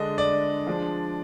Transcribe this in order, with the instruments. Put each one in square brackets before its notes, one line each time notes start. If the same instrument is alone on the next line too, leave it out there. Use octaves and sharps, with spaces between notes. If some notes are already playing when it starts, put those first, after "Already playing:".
Already playing: [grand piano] D3 G#3 D4 D#5
D5
F3 G#3 D4